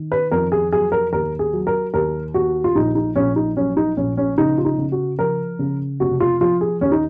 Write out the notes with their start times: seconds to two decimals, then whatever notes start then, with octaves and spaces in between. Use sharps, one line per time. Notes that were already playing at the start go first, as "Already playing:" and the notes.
Already playing: D#3
0.12 B4
0.31 F2 A#4
0.52 G#4
0.72 F#3 G#4
0.92 A#4
1.13 D#2 A#4
1.39 G#4
1.53 F#3
1.67 A#4
1.94 D#2 A#4
2.34 D#2 F#4
2.64 F4
2.75 A#1 D#4
2.95 D#4
3.16 A#1 C#4
3.36 D#4
3.56 F#3 C#4
3.77 D#4
3.97 A#1 C#4
4.17 C#4
4.38 C#3 D#4
4.58 F4
4.65 D#4
4.78 C#3
4.92 F#4
5.19 F3 A#4
5.59 C#3
6.00 F1 F#4
6.20 F4
6.41 F3 F4
6.61 G#4
6.81 D#2 C#4
6.92 D#4